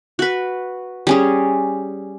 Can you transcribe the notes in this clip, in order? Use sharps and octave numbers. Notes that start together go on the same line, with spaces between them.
F#4 B4
G3 C#4 G#4